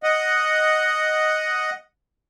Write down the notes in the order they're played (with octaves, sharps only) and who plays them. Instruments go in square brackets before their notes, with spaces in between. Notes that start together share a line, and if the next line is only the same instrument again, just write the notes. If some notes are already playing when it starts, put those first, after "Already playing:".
[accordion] D#5 F#5